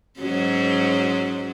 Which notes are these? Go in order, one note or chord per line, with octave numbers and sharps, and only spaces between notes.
G#2 F#3 C#4